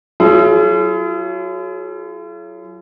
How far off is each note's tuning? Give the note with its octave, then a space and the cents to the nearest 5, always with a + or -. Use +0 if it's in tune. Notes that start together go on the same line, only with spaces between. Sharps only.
F#3 +0 F4 -45 G#4 +40